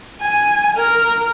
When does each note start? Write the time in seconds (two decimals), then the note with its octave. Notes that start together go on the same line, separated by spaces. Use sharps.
0.22 G#5
0.77 A#4